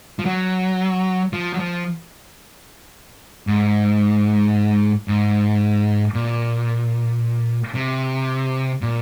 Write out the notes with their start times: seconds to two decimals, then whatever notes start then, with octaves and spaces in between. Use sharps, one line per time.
0.19 F3
0.26 F#3
1.33 F3
1.54 F#3
1.59 F3
3.47 G#2
5.08 G#2
6.14 A#2
7.75 C3
8.82 A#2